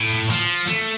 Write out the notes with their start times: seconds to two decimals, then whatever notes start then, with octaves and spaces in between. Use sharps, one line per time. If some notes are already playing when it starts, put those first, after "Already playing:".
Already playing: A2
0.30 F3
0.67 A3